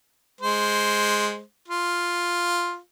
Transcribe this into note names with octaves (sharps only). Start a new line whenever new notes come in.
G#3 C5
F4